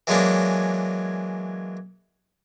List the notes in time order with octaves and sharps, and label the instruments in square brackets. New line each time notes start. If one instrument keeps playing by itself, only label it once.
[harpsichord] E3 F#3 G#3 A#3 C#4 D4